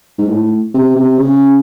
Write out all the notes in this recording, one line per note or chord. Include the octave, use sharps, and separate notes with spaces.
G#2
A2
C3
C3
C#3